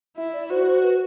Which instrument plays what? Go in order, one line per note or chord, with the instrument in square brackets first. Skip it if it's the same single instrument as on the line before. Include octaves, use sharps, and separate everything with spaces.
[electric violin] E4 [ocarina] E5
[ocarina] D5
[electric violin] F#4 [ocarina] C5
[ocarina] C5
B4